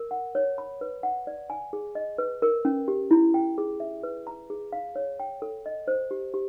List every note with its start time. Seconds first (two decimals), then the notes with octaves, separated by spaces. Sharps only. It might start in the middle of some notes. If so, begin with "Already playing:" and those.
Already playing: A#4
0.11 F#5
0.35 C#5
0.58 B5
0.81 B4
1.03 F#5
1.27 D5
1.50 G#5
1.73 G#4
1.95 D#5
2.18 B4
2.42 A#4
2.65 C#4
2.88 G4
3.11 E4
3.34 G5
3.58 G#4
3.80 E5
4.03 B4
4.27 A#5
4.50 G#4
4.73 F5
4.96 C#5
5.20 G5
5.42 A4
5.66 D#5
5.88 C5
6.11 G4
6.34 G4